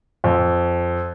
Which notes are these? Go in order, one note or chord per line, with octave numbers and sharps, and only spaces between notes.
F2